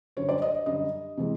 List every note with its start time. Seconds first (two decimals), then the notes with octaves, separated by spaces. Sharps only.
0.17 F#2 D3 G3 C#5
0.29 D5
0.42 D#5
0.66 F#2 D3 G3 D#5
1.17 C3 E3 G#3